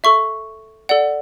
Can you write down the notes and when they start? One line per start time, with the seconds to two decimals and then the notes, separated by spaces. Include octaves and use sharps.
0.04 A4 E5 C#6
0.89 A4 D5 F#5